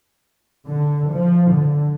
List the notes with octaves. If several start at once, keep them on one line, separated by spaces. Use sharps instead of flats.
D3
F3
D3